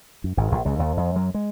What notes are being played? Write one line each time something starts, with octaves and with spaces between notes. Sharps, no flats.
F#2
G#1 G#2
A#1 A#2
C#2 C#3
D#2 D#3
F2 F3
F#2 F#3
G#3